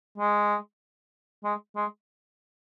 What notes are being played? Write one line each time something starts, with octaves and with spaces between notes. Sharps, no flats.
G#3
G#3
G#3